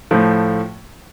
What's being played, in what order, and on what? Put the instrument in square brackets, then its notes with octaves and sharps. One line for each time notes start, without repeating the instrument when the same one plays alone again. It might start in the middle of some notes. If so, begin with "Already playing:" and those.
[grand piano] A2 F3 A3